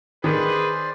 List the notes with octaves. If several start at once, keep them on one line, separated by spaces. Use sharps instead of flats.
D#3 G#4 B4 C5 D5